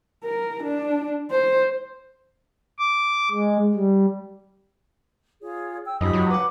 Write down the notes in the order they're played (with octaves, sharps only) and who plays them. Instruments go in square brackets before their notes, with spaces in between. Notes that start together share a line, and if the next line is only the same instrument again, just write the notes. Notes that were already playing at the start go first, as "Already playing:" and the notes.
[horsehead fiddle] A#4
D4
C5
[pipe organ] D6
G#3
G3
[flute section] F4 G#4 C#5
G5 E6
[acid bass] F#2 [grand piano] F3 D#4 [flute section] G4 B5 D#6
[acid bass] F#3
[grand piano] B4 F#5 [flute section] D6